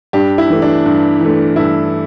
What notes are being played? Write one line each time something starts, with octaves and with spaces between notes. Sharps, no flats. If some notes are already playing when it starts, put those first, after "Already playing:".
G2 D4 G4
E4
E3 A3
D4
G2
E3 A3
G2 E4